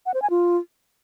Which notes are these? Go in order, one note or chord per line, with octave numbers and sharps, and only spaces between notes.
F#5
C5
G#5
F4